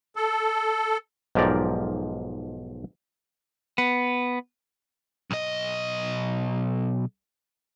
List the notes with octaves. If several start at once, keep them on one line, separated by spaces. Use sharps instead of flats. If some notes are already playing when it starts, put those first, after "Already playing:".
A4
B1 G#2 F3 G4 A#4 D5
B3
B1 D#5